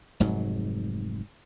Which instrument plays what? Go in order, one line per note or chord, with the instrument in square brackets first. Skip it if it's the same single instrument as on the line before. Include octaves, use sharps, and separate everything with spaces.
[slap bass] F1 G#2 F#3